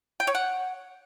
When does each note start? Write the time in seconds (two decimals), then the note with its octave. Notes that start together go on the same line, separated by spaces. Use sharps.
0.20 G5
0.27 C#5
0.35 F#5